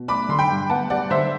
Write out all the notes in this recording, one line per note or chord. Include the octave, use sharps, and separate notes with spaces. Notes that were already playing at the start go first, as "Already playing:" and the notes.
Already playing: B2
A3 B5 D6
D3 C6
G5 B5
G2
B3 F#5 A5
G3 D5 F#5
D3 C5 E5